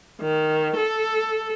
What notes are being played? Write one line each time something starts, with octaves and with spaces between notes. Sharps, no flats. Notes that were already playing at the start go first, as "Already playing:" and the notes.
D#3
A4